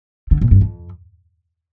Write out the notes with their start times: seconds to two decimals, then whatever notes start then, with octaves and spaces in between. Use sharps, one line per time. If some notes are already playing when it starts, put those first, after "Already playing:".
0.31 D3
0.41 A#2
0.51 G2
0.61 F2